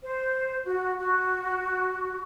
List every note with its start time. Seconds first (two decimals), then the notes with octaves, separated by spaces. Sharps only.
0.03 C5
0.64 F#4
0.98 F#4